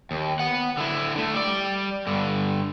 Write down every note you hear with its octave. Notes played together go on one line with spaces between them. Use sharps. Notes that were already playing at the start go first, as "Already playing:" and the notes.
D#2
B3 F#5
D3 E4
D3 A3
G3 D5
G2 D3